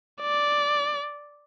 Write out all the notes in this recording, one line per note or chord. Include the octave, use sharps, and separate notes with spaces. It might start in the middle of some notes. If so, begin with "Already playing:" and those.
D5